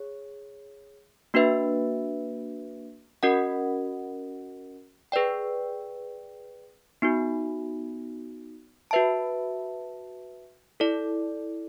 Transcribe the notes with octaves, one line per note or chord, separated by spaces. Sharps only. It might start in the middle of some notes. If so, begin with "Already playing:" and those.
Already playing: G#4 C#5
A#3 D4 F#4 B4 E5
C#4 F#4 A#4 D#5 F#5
G#4 B4 D5 G5
B3 D#4 F#4
F#4 B4 E5 A5
E4 A4 D5